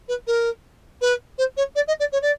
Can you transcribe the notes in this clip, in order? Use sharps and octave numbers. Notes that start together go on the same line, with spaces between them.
B4
A#4
B4
C5
C#5
D5
D#5
D5
C#5
D5